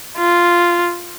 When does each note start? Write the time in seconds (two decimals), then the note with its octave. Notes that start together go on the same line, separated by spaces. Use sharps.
0.17 F4